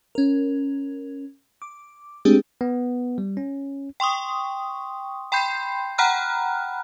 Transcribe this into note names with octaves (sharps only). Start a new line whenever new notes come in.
C#4 A#4
D6
G#3 A3 C4 D4 G4 G#4
B3
G3
C#4
G5 C6 C#6 D#6
G5 B5 C6 G6 C7
F#5 G5 A#5 B5 F6 F#6